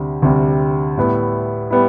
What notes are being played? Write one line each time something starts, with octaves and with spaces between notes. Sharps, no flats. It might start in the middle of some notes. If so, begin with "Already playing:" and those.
Already playing: D2 C3 G3
D2 C3 G3
A2 G3 B3 E4
G3 B3 E4